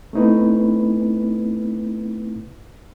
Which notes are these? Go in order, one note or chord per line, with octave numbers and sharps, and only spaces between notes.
A3 B3 C4 D#4 E4 B4